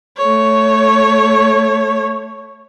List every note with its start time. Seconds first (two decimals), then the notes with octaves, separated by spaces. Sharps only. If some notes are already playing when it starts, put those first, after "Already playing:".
0.18 A3 C#5